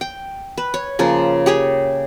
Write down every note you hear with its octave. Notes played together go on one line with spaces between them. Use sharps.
G5
B4
C#5
C#3 F3 A#3 F4
G4 G#4 C#5